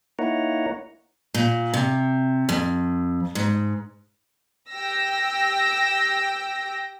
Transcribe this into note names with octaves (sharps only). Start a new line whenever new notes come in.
A#3 D#4 E4 C#5 F#5 A#5
A#2
C3
F2
G#2
G4 G5 E6 A#6